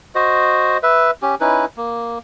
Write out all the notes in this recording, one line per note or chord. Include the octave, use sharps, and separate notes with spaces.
F#4 C5 D#5
B4 E5
C#4 G4
C#4 D#4 E4 B4
A#3